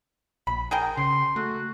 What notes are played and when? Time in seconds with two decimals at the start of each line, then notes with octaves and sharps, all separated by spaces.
0.47 A#1 B5
0.71 G#4 A#4 G5
0.97 C#3 C6
1.36 A3 F#4